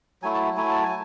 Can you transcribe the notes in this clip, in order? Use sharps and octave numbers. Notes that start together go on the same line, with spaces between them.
F#3 A3 E4 G#5
A5
F#3 A3 E4 G#5
A5
G#5